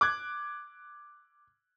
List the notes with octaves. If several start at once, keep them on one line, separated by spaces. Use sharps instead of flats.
D6 F#6 G#6